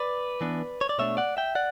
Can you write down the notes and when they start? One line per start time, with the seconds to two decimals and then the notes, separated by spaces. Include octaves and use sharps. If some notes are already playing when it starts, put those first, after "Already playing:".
Already playing: B4 D5
0.41 E3 B3 D4
0.81 C#5
0.89 D5
0.98 B2 A3 D4 C#5 E5
1.17 D5 F#5
1.37 E5 G5
1.55 D5 F#5